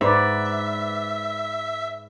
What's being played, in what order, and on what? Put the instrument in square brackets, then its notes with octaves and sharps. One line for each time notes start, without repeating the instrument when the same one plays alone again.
[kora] G#2 [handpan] B3 B4 D5 [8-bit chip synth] E5